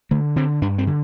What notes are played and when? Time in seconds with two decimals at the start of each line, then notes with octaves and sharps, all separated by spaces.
0.11 D3 A3
0.36 D3 C4
0.62 G2 D4
0.78 C4
0.87 D3